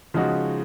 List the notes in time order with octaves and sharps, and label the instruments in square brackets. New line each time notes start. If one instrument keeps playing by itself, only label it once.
[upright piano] C#3 F3 G#3 D#4 F#4